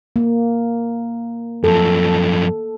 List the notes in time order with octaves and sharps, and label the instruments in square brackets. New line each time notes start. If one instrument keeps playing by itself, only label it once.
[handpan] A#3
[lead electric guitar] F#2 F3 [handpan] A4